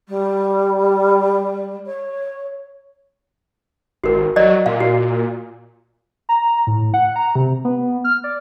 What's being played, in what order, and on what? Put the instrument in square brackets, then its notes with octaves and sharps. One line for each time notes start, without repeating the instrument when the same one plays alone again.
[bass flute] G3
C#5
[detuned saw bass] G#1 [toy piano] F#4 A#4
[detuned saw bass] F#3 [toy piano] D5 D#5
[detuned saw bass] A#2 [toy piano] F5
[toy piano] F#4
[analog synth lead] A#5
A2
F#5
A#5
C3
B3
F6
D5